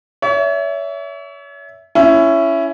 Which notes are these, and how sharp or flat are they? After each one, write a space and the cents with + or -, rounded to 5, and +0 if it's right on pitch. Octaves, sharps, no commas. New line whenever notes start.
C#5 +35 E5 +0
C#4 +5 E4 +15